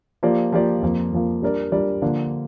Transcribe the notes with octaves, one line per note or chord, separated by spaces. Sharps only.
F3 A#3 G4 D5
F3 A#3 G4 D5
F2 F3 A#3
F2 F3 A#3
G3 D4 A#4 D5
G3 D4 A#4 D5
D3 F3 A#3 D4